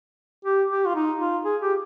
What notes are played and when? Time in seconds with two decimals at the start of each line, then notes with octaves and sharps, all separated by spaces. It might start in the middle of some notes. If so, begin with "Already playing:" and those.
0.45 G4
0.70 G4
0.85 F4
0.95 D#4
1.19 F4
1.45 G#4
1.62 G4